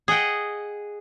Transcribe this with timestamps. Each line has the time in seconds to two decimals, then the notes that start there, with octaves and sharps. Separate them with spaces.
0.08 G#4 D#5 F#5 G5